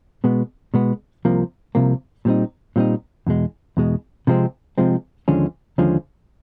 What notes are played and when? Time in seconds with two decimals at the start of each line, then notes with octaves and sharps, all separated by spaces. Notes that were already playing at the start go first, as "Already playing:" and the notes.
0.24 B2 G#3 B3
0.74 B2 G#3 B3
1.25 C2 C3 F3 A#3
1.75 C2 C3 F3 A#3
2.25 A#2 G3 C4 D#4
2.76 A#2 G3 C4 D#4
3.27 E2 B2 G#3
3.77 E2 B2 G#3
4.27 C3 F3 G#3 C4
4.78 C3 F3 G#3 C4
5.28 D#2 D3 F3 G#3 C#4
5.78 D#2 D3 F3 G#3 C#4